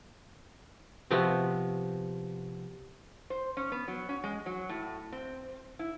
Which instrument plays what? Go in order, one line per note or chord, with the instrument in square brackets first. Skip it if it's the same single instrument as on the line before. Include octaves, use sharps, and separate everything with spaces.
[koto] C3 F3 B3 C4 F#4
[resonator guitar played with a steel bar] C5
C#4
B3
F#3
C#4
G#3
F#3
A2
C4
E4